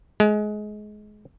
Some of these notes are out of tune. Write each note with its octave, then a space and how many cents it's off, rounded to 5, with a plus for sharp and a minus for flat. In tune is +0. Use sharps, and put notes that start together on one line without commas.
G#3 +25